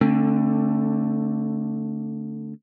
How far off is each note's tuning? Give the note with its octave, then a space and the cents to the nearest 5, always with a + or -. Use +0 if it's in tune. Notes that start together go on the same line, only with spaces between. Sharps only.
D3 +0 A3 +15 C4 +45